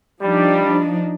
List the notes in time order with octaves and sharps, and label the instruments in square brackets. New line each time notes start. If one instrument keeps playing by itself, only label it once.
[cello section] F3 D4 D#4 [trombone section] G3